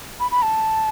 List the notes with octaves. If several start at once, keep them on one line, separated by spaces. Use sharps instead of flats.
B5
B5
A5